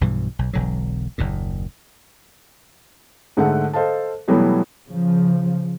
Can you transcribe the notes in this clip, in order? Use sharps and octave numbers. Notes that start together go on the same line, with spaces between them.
B1 G2 B2 E3
B1
E1 B1 D3 F#3
F#1 D#2 A#2
G#2 D3 A3 F#5
A4 C5 D#5 F5 A5
B2 E3 F#3 G3 A3 B3
C#3 F3